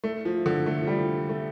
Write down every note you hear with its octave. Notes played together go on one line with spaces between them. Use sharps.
A3
F3
D3
A3
F3
G3
A3